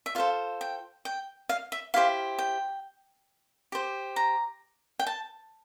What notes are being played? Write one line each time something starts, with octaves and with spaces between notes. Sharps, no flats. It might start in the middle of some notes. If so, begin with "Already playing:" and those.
E5
F4 A4 C5 F5
G5
G5
F5
E5
E4 G4 C5 F5
G5
G4 C5
A#5
G5
A5